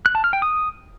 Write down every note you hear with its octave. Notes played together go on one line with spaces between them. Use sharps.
F#6
A5
F6
G5
D#6